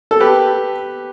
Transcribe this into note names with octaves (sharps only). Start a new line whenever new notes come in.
A4
G4 B4